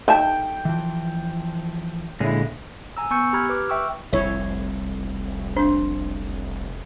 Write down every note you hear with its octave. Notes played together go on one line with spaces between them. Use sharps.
D#4 E5 G5 A5
E3 F3
A#2 D3 G#3 C#4 E4
G#5 A#5 E6
B3 G#5 C#6 E6 G6 C#7
G4 A#5 B5 F6 G#6
B4 D6 F6
E5 G5 C#6 E6
F1 C2 E4 C#5 E5
D4 C5